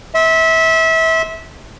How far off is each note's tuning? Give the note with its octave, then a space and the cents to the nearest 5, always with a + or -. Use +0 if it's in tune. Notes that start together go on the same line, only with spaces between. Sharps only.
E5 -25 C6 +0